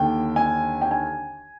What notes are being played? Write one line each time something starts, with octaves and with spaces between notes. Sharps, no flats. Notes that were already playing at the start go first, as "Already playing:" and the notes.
Already playing: D#2 D3 G5
G#5
G5
G#5